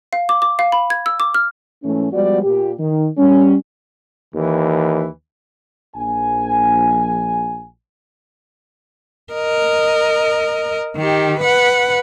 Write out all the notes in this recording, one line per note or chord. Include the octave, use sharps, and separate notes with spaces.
F5
D6
D6
F5
B5
G#6
E6
D6
F6
G#2 E3 A3 C#4
F3 G3 G#3 B3 F#4 D5
A#2 G4
D#3
G3 C#4
D#2 E3
A#1 G#5
A#4 D#5
D#3 G4
B4 F#5